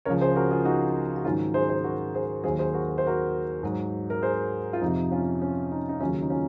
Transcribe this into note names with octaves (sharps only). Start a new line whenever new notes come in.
C#2 C#3 F3 A#4 C#5
G#4 C5
F#4 A#4
F4 G#4
D#4 F#4
F#4
G#2 D#3 F#3 C#4 F4
G#4 C5
G#4 C5
F#4 A#4
G#4 C5
D#2 D#3 F#3 G#4 C5
G#4 C5
F#4 A#4
A#4
C5
F#4 A#4
G#2 F#3
A#4
G#4 C5
F4
F2 C3 F3 D#4
C#4 F4
C#4
D#4
D#4
D#2 C#3 F#3 C#4 F4
D#4
C#4 F4